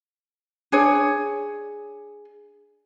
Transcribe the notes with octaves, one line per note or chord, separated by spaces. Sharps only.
D4 G#4 C#5